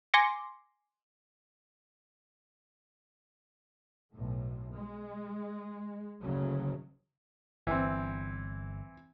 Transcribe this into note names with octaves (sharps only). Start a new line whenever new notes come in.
G#5 C6 D6 A#6 C#7
B1 A2
G#3
F#1 D2 C#3 F#3
G1 E3 C4